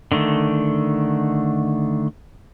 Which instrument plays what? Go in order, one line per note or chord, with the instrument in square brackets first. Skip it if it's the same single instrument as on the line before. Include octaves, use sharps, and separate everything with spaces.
[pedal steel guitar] D3 D#3 A3